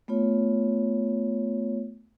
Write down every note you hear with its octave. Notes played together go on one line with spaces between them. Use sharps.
A3 B3 F4 C#5